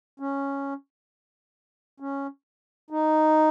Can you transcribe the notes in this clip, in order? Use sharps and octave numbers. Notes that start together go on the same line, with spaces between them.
C#4
C#4
D#4